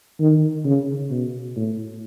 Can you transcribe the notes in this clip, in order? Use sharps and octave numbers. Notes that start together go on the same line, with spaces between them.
D#3
C#3
B2
A2